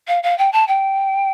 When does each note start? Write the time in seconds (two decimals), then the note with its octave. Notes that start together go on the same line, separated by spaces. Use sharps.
0.08 F5
0.23 F5
0.38 G5
0.52 A5
0.68 G5